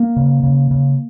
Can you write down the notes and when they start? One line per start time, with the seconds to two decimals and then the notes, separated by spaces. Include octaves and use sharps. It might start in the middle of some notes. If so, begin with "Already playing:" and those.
Already playing: A#3
0.16 C#3
0.43 C#3
0.71 C#3